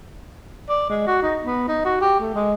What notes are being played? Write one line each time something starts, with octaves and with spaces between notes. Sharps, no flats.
D5
G#3
F#4
D#4
B3
D#4
F#4
G4
A3
G#3